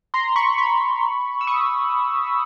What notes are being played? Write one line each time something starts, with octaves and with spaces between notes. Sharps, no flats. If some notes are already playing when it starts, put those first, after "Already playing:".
A#5 C6
B5 C#6
B5 C#6
E6
C#6 D#6